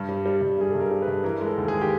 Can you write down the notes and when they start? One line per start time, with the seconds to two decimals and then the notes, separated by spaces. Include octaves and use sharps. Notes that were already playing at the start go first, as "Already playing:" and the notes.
Already playing: G2
0.09 G3
0.26 G3
0.41 G2
0.58 G2 G#4
0.71 G2 A4
0.80 A#4
0.91 G3
1.02 B4
1.08 G2
1.24 E3 A#4
1.41 G#3
1.46 A4
1.57 D#2
1.68 G#4
1.74 G#3
1.81 G4